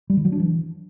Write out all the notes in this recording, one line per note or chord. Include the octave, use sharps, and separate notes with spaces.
G3
D#3
F#3
D4
E3